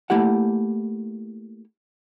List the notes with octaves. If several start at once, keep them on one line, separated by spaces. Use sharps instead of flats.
A3 A#3 E4 G4 F#5